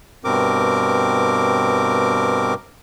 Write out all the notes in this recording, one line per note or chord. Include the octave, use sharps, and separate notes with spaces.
G2 B2 C4 A#4 D6